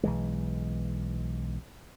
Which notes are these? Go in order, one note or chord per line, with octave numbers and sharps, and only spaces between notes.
B1 E3 G#3